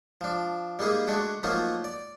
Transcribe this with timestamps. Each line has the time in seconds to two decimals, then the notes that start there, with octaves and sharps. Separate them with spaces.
0.21 F3 D4
0.79 G3 G#3 A#3 D#4 G#4
1.07 G#3 A3 D4 F#4
1.43 F3 F#3 A3 A#3 D#4 F4
1.84 D5